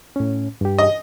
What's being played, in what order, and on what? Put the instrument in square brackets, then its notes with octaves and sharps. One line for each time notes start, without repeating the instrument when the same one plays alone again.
[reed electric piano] A2 C#4
G2 G4
[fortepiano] D#5